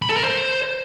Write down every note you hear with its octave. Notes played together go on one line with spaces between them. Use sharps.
B5
A4
A#4
C5